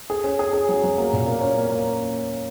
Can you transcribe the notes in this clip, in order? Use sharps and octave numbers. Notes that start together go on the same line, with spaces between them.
G#4
C#4
G#4
G#4
F#3
F#3
A#3
A#2
A#3
C#4
A#3
A#3